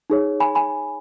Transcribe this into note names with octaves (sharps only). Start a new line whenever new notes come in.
D#4 G#4 C#5
G#5 B5
G#5 B5